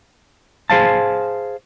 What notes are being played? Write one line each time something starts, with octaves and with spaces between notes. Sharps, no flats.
G#4 C5 F5 A5